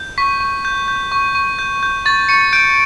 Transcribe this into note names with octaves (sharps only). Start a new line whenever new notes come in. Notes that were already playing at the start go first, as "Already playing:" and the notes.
Already playing: G6
C#6 B6
C#6
G6
G6
C#6
C#6
G6
G6
C#6 A6
C#6 C#7
G6 D7